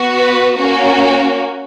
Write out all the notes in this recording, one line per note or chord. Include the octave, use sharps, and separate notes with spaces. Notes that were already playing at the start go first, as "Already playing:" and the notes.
Already playing: B3 F#4
B4
A#3 C#4 F#4